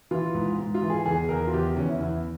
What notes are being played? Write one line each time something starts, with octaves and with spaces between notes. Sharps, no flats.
E3 F4
G#2
G#2
F4
E3
G#4
E2 G#4
E2 A#4
F4
E2 G4
E2 C#4
E4
E2 E4